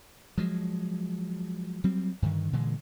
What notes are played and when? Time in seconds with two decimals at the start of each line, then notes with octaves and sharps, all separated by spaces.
0.38 F3 F#3 G#3
1.84 F#3 G3 C4
2.22 G2 D3 D#3
2.53 A#2 D3 E3 G#3